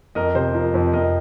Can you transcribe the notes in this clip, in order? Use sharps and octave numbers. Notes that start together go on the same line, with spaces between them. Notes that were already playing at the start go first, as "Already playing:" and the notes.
F2 A#4 D#5
C3 C5
F3 A#4
F2 C5
F2 A#4 D#5
D#5